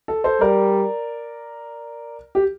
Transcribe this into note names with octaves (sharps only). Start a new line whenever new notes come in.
A4
A4 C5
G3 A#4 D5
G4